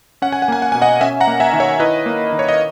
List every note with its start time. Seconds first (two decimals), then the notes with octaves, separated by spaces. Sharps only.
0.22 C#4 F#5
0.32 G#5
0.42 F#5
0.48 A#3 G#5
0.62 F#5
0.72 B2 G#5
0.82 D#5 F#5
1.01 C#4 E5 G#5
1.21 F#5 A#5
1.27 A#3
1.40 E5 G#5
1.53 D#3
1.60 C#5 E5
1.80 E4 B4 D#5
2.06 A#3
2.32 D#3
2.39 C#5
2.48 D#5